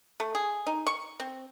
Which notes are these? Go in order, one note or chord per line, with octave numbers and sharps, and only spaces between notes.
A3
G#4
D#4
C#6
C4